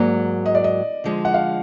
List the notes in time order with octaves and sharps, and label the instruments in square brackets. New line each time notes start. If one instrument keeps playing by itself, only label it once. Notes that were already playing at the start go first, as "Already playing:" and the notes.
Already playing: [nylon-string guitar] G#2 F#3 A#3 [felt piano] D5
[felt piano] D#5
D5
D#5
[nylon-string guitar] D3 F3 G#3
[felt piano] F#5
F5